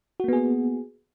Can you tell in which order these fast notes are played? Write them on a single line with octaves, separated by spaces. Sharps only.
F#4 A#3 B3 G#4